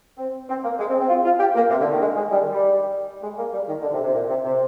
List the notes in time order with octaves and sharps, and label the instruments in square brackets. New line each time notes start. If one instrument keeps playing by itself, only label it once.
[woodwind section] C4
C4
A#3
G#3
C4
C4
F4
F4
G4
A#3
C3
D3
D#3
G#3
G#3
G3
D#3
G3
G#3
A#3
G3
D#3
D3
C3
C3
A#2
C3
C3